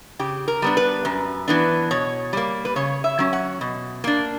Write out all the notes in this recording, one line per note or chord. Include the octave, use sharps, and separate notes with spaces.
C#3 G4
A#4
G3 B3 D4
B4
F#2
E3 B3 D4
B2 C#5
G3 A#3
B4
C#3 C#5
E5
F#3 C#4
F#5
B2
A#3 D4